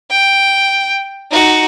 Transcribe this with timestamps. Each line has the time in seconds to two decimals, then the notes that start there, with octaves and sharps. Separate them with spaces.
0.11 G5
1.31 D#4 F#4